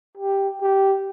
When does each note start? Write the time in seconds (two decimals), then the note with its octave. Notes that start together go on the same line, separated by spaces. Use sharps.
0.17 G4
0.61 G4